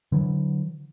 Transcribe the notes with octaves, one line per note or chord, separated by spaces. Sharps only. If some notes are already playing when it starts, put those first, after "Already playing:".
D3 E3 F#3